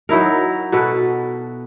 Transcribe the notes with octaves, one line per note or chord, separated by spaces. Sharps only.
F#3 D#4 E4 A#4
B2 F#4 A4 B4